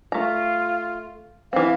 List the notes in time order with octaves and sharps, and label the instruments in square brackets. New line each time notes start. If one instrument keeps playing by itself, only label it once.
[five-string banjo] A3 A#5 [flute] F4
[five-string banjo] E3 C4 [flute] F5